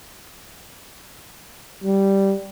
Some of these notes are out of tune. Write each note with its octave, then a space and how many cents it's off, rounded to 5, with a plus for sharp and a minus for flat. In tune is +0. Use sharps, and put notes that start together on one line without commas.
G3 -5